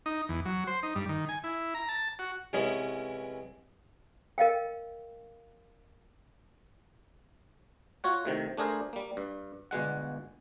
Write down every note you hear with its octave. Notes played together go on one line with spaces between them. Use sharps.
D#4
E2
F#3
C5
D#4
G2
D#3
G#5
E4
A#5
A5
F#4
C2 E3 G#3 C#4 D#6
A#4 D#5 F5 G5
F4 F#4 C#5 F#5
A2 C3 D#3
A3 D4 G#4 A#4 C5
G3 A#3
G2
G1 B2 G#3 F#5